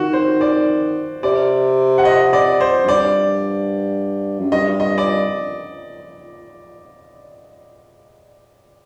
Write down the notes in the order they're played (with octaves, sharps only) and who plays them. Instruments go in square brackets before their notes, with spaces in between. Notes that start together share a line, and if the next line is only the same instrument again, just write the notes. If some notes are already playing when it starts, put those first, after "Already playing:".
Already playing: [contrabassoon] D#3 [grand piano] F#4
[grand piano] C5
D5
[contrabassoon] C3 [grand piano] D5
[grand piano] F#5
D#5
D5
C5
[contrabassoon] F#2
[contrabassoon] G2 [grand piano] D5
[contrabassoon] F#2
[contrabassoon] G2 [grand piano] D#5
[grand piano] D#5
D5